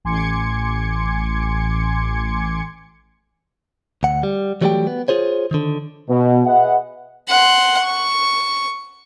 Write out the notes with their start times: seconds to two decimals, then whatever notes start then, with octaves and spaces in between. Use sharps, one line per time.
0.04 A1 G#5 C6 D6 G#6 C#7
4.03 D2 F#5
4.23 G3
4.61 E3 F#3 G3 A3 G4 G5
4.87 B3
5.08 F4 G#4 C5 C#5
5.51 D3 D#3
6.09 B2
6.45 G#4 B4 D#5 E5 F#5
7.29 F#5 C6
7.84 C#6